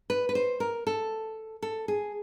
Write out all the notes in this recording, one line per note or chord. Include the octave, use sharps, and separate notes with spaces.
B4
B4
C5
A#4
A4
A4
G#4